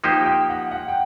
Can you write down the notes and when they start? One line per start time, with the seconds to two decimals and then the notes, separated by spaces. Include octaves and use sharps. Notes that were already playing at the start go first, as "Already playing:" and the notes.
0.04 F3 A#3 D#4 G4 C5 G5
0.26 G5
0.49 F#5
0.71 F#5
0.88 G5